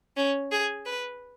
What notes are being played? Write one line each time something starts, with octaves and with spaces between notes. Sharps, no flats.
C#4
G#4
B4